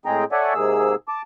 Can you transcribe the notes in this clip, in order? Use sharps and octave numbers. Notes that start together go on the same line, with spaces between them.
A2 G#3 C4 G#4 G5 A#5
A4 C#5 D5 E5 F#5 G#5
G#2 C3 A#3 G#4 E6
A5 D6